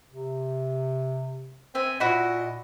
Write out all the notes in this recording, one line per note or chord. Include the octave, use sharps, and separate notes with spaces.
C3
C4 E5 G#5
A#2 E4 F#4 D#5 B5